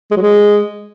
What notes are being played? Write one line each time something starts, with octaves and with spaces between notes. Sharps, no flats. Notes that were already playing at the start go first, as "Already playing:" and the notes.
G#3
F#3
G#3